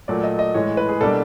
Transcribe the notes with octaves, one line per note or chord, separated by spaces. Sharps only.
A#2 F#3 A3 D5
D#5
D#5
A2 E3 G#3 C#5
B4
G#4
B2 G3 A#3 D4 A4